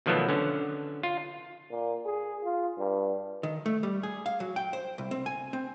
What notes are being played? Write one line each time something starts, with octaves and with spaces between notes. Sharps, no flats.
B2 D#3 F3 F#3 A3 B3
D3 C#4
F4
A#2
G#4
F4
G2
D#3
A3
G3
G#4
F5
F#3
G5
C5
C2
C4
G#5
C4